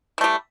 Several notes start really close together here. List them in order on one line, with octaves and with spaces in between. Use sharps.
E3 A3 G3